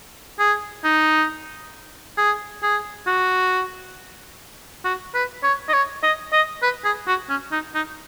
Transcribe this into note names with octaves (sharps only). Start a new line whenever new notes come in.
G#4
D#4
G#4
G#4
F#4
F#4
B4
C#5
D#5
C#5
D#5
D#5
B4
G#4
F#4
C#4
D#4
D#4